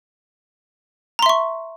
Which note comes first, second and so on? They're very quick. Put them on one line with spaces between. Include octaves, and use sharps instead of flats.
A#5 C6 E5 C#6